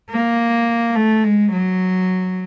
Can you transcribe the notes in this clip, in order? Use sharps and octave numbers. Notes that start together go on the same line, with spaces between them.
A#3
A3
G#3
F#3